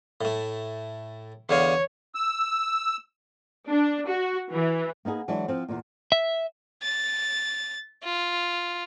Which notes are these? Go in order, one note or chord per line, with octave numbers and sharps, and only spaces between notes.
A2 A3
E2 D3 C#5 F5
E6
D4
F#4
E3
A#3 B3 D#4 G#4
E3 F#3 G#3 D4 E4
F3 C4
E2 A#2
E5
A6
F4